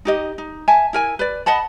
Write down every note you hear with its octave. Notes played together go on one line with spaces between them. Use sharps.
D#4 G4 D#5
D#4
E5 G#5 A5
E4 A#4 G#5
B4 D5
D#5 F#5 A5 B5